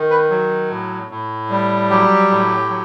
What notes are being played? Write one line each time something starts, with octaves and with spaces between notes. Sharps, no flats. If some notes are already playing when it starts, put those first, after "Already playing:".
Already playing: D#3
B4
F#3
A2
A2
G3
F#3 G4
A2
F#3